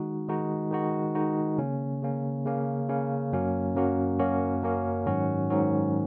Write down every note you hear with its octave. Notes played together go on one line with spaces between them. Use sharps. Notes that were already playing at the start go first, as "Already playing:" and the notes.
Already playing: D#3 G#3 D#4 F#4
D#3 G#3 D#4 F#4
D#3 G#3 D#4 F#4
D#3 G#3 D#4 F#4
C#3 A#3 C#4
C#3 A#3 C#4
C#3 A#3 C#4
C#3 A#3 C#4
F#2 F#3 A#3 C#4 F#4
F#2 F#3 A#3 C#4 F#4
F#2 F#3 A#3 C#4 F#4
F#2 F#3 A#3 C#4 F#4
G#2 D#3 F#3 C#4 F#4
G#2 D#3 F#3 C#4 F#4